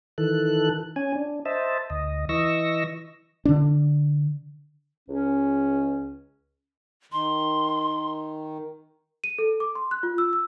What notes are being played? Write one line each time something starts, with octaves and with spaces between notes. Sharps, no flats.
D#3 E3 A4 F#6
C#4 G#5
D4
C5 D#5 E5 A5
D2 D#5
E3 D#5 C#6 E6 A#6
D3 D4
C#2 C#4
D#3 C6
D#7
A4
D6
C6
F#6
F4
E6
E6